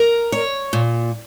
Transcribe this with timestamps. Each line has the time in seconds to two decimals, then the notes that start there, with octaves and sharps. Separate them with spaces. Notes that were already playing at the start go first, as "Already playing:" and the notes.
Already playing: A#4
0.32 C#5
0.73 A#2